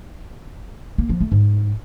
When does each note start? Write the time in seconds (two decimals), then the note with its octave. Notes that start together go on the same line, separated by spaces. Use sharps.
0.98 A#3
1.09 F3
1.21 A3
1.32 G#2